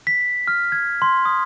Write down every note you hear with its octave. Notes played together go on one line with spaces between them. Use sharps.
B6
F6
G#6
C6
D#6